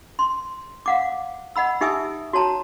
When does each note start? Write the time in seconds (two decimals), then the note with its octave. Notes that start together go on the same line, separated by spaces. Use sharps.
0.19 C6
0.86 F5 F#5 D6
1.56 D#5 F#5 B5 E6
1.81 D#4 G4 E5 G#5 D#6 E6
2.33 F#4 C#5 A5 A#5